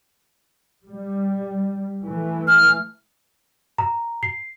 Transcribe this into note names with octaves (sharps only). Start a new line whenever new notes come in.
G3
E3 A3
F6
A#5
C7